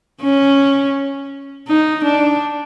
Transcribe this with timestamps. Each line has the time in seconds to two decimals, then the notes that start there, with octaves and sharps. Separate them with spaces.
0.22 C#4
1.68 D#4
2.04 D4